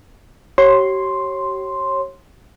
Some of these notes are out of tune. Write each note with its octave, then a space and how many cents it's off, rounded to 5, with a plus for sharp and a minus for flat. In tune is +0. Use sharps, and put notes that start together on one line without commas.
G4 -40 C#5 -25 C6 +0